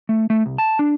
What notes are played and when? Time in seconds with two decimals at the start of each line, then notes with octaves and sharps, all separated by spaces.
0.09 A3
0.30 A3
0.46 C2
0.58 A5
0.79 D4